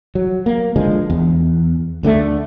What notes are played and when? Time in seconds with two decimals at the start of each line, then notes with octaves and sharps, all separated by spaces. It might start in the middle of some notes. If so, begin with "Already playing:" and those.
0.15 F#3
0.46 A#3
0.76 D3 F3 G#3
1.10 E2
2.03 D2 D3 G3 A3